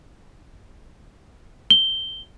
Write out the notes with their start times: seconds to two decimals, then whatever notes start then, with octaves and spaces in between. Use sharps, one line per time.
1.70 G7